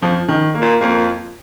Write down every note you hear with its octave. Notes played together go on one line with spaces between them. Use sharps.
F2 F3
D#3
A#3
A#2
F2 A#3